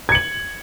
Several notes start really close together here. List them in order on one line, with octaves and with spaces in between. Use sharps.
G#6 C#7 F#7